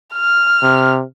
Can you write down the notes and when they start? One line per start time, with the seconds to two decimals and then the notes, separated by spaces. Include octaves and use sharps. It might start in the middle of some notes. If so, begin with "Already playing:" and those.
0.14 F6
0.63 C3